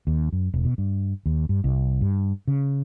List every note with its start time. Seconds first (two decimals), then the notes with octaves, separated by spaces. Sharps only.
0.07 D#2
0.32 F#2
0.54 E1
0.65 B2
0.78 G2
1.26 D#2
1.49 G2
1.64 C2
2.01 G2
2.47 C#3